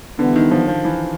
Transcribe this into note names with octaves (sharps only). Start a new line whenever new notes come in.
D3 E3 G3 B3
D#3
F3
F3
E3